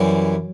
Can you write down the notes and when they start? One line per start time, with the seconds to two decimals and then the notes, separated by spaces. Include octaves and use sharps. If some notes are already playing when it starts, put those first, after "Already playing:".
Already playing: F#2 E3 F#3 G3